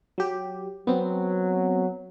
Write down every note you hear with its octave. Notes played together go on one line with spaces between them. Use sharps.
F#3 G4
F#3 B3 C4